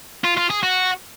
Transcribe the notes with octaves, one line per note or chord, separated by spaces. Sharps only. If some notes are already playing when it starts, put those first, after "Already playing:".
F4
F4
G#4
F#4